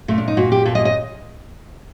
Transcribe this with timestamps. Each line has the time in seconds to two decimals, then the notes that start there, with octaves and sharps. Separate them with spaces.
0.08 A#2 A3
0.18 D4
0.28 D#4
0.37 A#2 F#4
0.52 G4
0.65 A#2 A4
0.75 D#5
0.85 D#5